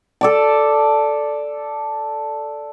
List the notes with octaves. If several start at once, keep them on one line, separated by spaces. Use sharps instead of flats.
A4 D5 A5